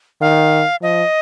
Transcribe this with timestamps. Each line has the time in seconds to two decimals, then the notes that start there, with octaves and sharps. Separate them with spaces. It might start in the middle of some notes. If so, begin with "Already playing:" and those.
0.21 D#3 F5
0.81 F3 D#5